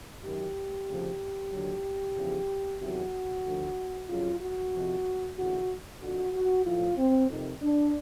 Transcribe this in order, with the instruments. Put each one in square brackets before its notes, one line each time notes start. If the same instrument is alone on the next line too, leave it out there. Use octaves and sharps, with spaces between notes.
[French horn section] F#2 D#3 F#3 G4
D2 C#3 F3
D#2 D3 F#3
E2 C#3 F3
E2 C3 D#3 F#3 F#4
D2 D3 F3
F2 C#3 F#3 F4
F#4
F2 C3 F3
D2 C#3 E3 F#4
F2 D3 F3 F#4
F#4
A2 F3 F4
C4
F2 C3 D#3
D4